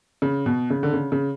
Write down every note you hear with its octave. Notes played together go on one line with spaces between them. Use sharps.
C#3
B2
C#3
D3
C#3
C#3